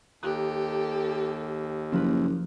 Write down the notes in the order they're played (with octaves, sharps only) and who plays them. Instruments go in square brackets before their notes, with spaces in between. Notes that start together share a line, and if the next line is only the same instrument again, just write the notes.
[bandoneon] D#2 [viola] G4 A4 [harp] A#5 D#6 F#6
[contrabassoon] F#1 [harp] F3 A#3 B4